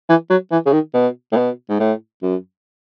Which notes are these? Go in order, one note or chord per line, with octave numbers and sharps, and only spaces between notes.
E3
F#3
E3
C#3
D#3
B2
A2
B2
G#2
A2
F#2